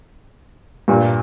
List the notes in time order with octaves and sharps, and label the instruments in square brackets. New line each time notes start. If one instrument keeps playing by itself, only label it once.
[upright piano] G2 A#2